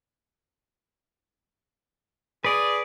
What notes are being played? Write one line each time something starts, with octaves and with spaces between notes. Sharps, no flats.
G#4 B4 D5